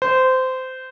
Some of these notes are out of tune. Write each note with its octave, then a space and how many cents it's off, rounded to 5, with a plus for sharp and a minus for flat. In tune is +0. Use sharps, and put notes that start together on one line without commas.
C5 -20